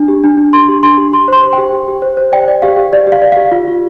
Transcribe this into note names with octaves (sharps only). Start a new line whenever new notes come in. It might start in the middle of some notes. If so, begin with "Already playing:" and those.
Already playing: D4
G4
D4
D4
D4 C6
G4
D4 C6
G4
G4 C6
C5 C6
C5
G5
G4
G4
G4
C5
C5
D5 G5
D5
G4 F5
G4
G4 D5
G4
F5
D5
G4 F5
F4
F4